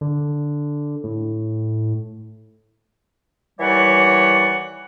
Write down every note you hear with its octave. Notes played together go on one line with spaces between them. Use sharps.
D3
A2
D#2 E3 G3 C#5 D5 F#5